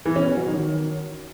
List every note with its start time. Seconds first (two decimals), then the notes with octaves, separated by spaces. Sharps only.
0.05 E3
0.16 C#4
0.26 C#4
0.37 F#3
0.47 D#3